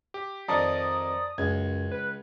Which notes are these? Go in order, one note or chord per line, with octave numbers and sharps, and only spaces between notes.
G4
F2 D#3 D5 A5 A#5 D#6
C#2 F#2 G#6
B4